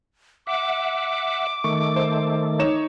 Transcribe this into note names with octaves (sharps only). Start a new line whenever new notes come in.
E5 F#5 D6
D#3 A3 C#6
C5
D#4 C#5 E7